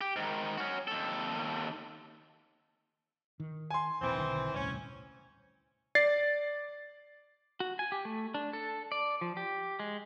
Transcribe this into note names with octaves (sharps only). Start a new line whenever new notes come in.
G4
G#2 D#3
C#4 F#4
D#2 A4
D#3
G#5 C6
E1 A#1 E3 C4
B1 D3 D#3
D#1 C2 A2 C#4
D5 A6 C7
F#4
G#5
G4
A3
D4
A4
D5
F3
G4
G#3